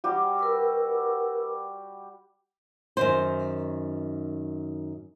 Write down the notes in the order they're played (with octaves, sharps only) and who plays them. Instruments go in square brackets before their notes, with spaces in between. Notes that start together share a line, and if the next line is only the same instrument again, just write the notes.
[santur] G3 F#4 G4
[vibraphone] A#4 B4 E6
[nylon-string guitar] F#2 D#3 C5